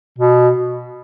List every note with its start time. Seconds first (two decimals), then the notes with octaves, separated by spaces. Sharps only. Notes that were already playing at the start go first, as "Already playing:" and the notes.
0.18 B2